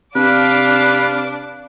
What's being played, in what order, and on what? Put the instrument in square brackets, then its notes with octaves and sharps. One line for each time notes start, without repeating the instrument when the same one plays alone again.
[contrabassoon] C3 [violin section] D4 D6 [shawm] B4 [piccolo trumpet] F5